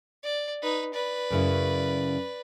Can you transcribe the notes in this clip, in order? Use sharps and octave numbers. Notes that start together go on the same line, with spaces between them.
D5
D#4 B4
B4 D5
F#2 C#3 E4